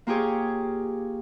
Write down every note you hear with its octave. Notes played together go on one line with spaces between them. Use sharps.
A#3 F4 G4 G#4 C#5